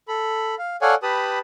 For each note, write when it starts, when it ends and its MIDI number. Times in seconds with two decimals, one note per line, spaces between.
0.08 0.55 69
0.08 0.55 83
0.58 0.76 77
0.82 0.95 69
0.82 0.95 73
0.82 0.95 74
0.82 0.95 77
0.82 0.95 78
0.82 0.95 80
1.03 1.39 67
1.03 1.39 71
1.03 1.39 81
1.03 1.39 83
1.03 1.39 87